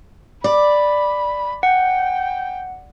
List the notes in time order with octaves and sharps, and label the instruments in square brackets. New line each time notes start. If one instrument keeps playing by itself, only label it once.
[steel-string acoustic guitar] D5 [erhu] B5
[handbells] F#5 [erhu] G5